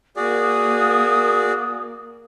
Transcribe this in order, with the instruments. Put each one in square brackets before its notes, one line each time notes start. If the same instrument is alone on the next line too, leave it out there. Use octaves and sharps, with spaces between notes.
[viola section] A#3 [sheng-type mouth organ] F#4 G#4 D5 [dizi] D#6